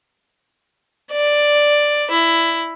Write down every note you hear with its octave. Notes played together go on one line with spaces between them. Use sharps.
D5
E4